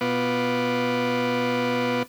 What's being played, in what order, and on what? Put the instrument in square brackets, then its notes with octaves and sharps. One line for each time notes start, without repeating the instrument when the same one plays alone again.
[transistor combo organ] B2 B3 F4 B4 D6